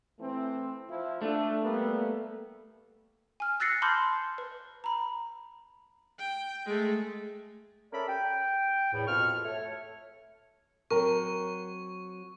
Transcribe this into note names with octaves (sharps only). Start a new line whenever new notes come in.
E3 A3 C4
F3 E4
A3 D4
G3 A#3 B3
G#5 F6
E6 F#6 A6 A#6 C7 C#7
A5 B5 C6 D6 F6 G6
B4
A#5 B5
G5
G#3 A3
C#4 A4 A#4 D5 E5 B5
G5
E2 A2
F2 B2 F4 C#6 F6
A3 C#5
F#3 C4 A#4 A#5 C#6